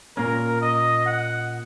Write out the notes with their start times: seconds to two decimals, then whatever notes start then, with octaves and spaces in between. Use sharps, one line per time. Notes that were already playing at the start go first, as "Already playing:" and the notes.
0.17 A#2 A#3 C#4 A#4
0.61 D#5
1.06 F#5